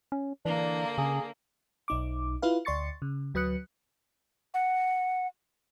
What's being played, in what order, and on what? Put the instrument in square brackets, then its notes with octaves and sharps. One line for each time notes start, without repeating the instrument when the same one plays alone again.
[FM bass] C#4
[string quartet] D3 A#3 [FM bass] E3 [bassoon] D4
[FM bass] C#3 [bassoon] G#4
[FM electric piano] B1 D#4 D6
E4 F4 B4 F5
D2 D5 C6 C#6 A6 C#7
C#3
D2 F#3 B4 D#6 F#6 C#7
[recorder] F#5